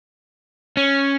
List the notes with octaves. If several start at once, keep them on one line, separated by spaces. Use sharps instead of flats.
C#4